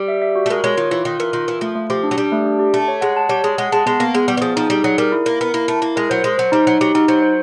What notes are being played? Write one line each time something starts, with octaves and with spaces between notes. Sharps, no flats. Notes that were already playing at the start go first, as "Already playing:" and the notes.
Already playing: G3
E5
E5
F#4
A3
G#3 A#4
G#3 C#5
D#3 F4
E3 F4
D#3 F4
E3 A#4
D#3 F4
E3 F4
F3 A3
A3
F3 G4
D4
F#3
G3 D4
A3
D4
G4
A3 A5
C#5
G#3 F#5
A5
G3 C#5
G#3 G#4
G#3 F#5
G#3 A5
G#3 B3
A#3 B3
G#3 B3
G3 B3
E3
F3 G#4
F3 D#4
G3 D#4
F#3 G#4
G3 A#4
E4
A#3 A#4
B3 A#4
A#3 E4
A3 E4
A#3 E4
G#3 A#4
F#3 C5
G#3 C5
F#3 C5
G3 D#4
F#3 D#4
F#3 G4
F#3 D#4
F#3 C5
C5